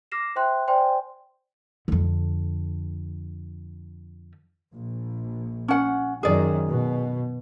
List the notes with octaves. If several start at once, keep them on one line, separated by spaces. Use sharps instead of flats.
D6 F6 A#6 C7 E7
C5 E5 G5 C6 F#6
C5 D5 G5 G#5 C6
F2 D3
A#1
C#4 F#5
F#2 D#3 G#4 D5
B2